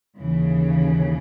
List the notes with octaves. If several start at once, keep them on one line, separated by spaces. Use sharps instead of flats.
D#2 C#3 E3